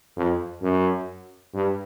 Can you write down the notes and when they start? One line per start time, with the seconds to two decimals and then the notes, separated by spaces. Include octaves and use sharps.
0.17 F2
0.62 F#2
1.54 G2